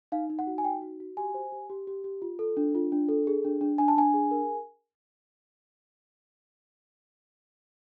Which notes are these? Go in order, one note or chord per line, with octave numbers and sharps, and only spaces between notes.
D#4 F5
D#4
F#5
F#4
G#5
D#4 G5
F#4
F#4
G4 G#5
C5
G4
G4
G4
G4
F4
A4
D4
F4
D4
A4
G#4
D4
D4
D4 G#5
A5
D4 G#5
G#4
A#4